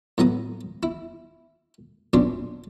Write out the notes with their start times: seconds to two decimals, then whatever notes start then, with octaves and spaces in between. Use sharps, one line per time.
0.18 A2 F#3 B3 A#5 D#6
0.83 E4
2.13 A#1 B2 C#4 D4 C6